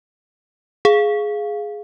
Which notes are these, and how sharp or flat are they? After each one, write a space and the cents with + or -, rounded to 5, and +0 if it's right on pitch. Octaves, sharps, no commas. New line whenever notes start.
G#4 +10 F5 +0